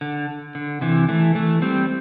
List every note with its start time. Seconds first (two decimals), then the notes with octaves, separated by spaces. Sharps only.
0.01 D3
0.55 D3
0.81 C3 E3
1.09 E3 A3
1.35 E3 A3
1.62 G3 C4